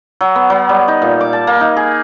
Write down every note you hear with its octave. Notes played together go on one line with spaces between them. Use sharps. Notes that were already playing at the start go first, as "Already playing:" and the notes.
F#3
B3
F#3
G3
D#4
A#2
D6
A5
A#3
D#4
G#4